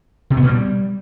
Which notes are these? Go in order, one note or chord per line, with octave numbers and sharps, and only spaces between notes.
C3
B3
B2
G3